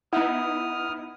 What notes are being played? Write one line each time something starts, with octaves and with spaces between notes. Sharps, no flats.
B3 D#4 E4 F#5 D#6 F6